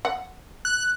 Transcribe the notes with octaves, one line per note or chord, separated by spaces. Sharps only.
F#5
F#6